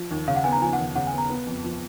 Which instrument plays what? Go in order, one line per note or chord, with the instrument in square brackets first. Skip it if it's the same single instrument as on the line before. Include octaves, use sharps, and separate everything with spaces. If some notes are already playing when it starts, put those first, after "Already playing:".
Already playing: [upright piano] F3
D#2
[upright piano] C#3 [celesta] F5
[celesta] F#5
[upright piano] B3 [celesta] G#5
[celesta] A#5
[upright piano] F3 [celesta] G#5
[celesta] F#5
[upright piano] D#2
[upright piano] C#3 [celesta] F#5
[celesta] G#5
[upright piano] B3
[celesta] A#5
[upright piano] B3
F2
F3